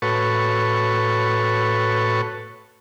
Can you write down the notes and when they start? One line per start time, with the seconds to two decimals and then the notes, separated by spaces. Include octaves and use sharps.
0.02 A2 F#4 A4 B4 C#5 C#6